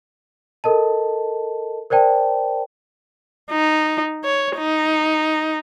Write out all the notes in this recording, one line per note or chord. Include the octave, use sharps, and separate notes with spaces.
A4 A#4 D#5 A5
A#4 C5 D5 G5 A5
D#4
C#5
D#4